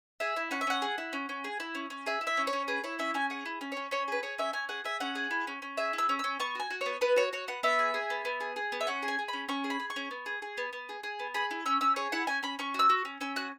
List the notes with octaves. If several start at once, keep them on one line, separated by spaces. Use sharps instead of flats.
G#4 E5
E4
C#4 F#5
E5
C#4 F#5
G#4
E4
C#4
C#4
G#4
E4
C#4
C#4
G#4 E5
E4
E5
C#4
C#5
C#4
G#4 B4
E4 C#5
C#4 E5
C#4 G#5
G#4 F#5
E4
C#4
C#4 C#5
C#4 C#5
G#4 B4
G#4 C#5
C#4 E5
C#4 G#5
G#4 F#5
G#4 E5
C#4 F#5
G#4
E4
C#4
C#4
G#4 E5
E4
E6
C#4
C#4 E6
B3 C#6
F#4 G#5
F#4
B3 C#5
B3 B4
F#4 C#5
F#4 C#5
B3 F#5
B3 E5
G#4
G#4
B3
B3
G#4
G#4
B3
E5
C#4 F#5
G#4
G#5
G#4
C#4 B5
C#4 C#6
G#4
B5
G#4
C#6
C#4
B3
G#4
G#4
B3
B3
G#4
G#4
B3
G#4 B5
E4
C#4 E6
C#4 E6
G#4 C#5
E4 F#5
C#4 G#5
C#4 B5
C#4 C#6
F#4 E6
F#4
C#4
C#4 E6
F#4 F#6